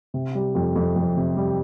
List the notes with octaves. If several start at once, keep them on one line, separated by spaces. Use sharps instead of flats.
C3
G3
F2
F2
F2
C3
G3